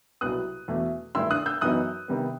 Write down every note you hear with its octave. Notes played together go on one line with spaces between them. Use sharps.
C2 B2 F#3 B3 D#6 F#6
E2 B2 A3
G2 D#3 A3 E4 C6 E6
D#6 F#6
E6 G6
F#2 E3 B3 D#4 D#6 F#6
C3 D#3 G3 B3